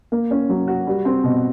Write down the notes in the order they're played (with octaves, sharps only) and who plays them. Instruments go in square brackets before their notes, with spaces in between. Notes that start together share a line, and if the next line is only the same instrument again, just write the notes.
[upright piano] A#3
C#4
F#3
F#4
G3
C4
B2